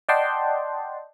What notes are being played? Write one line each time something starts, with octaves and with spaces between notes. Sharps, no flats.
D5 D#5 F#5 G5 A5 C6